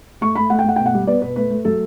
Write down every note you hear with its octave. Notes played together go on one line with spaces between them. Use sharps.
A3 C#6
A3 B5
A3 F#5
G5
A3 F#5
B2 G5
F#5
G3
B3 D5
B2 B4
A3 B4
A3
F#3 A4